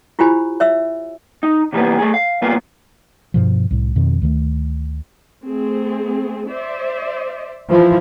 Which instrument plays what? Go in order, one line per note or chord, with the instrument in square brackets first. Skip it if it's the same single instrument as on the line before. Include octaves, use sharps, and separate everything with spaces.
[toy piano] E4 F4 G4 C5 G#5 B5
C#5 E5 E6
[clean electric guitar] D#4
C3 E3 F#3 G3 A#3 B3
A3 G#4
F5
G2 B2 A#3 B3 F4
[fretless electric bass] G2 B2 F3
C2 A2
F2 B2 D#3
D2 D#3 F#3 A3
[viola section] A3 C4 G#4
C5 D5 E5
[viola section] E3 E4 [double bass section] F3